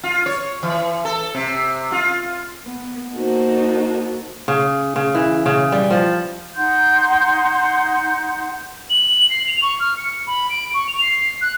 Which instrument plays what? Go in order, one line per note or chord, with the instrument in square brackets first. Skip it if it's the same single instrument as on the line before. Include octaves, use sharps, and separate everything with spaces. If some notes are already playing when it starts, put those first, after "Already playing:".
[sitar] F4
C#5
E3
A4
C3
F4
[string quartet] B3
A#3 D#4 F#4 A4 C5
[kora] C#3
C#3
E3
C#3
G3
F3
[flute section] D#4 F#5 C6 G6
[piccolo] F#7
C7
F7
C#6
F6
C#7
B5
D7
C#6
F7
C7
F#6